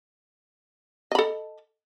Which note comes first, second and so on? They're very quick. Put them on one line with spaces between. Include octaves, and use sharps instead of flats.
D#5 B5 A4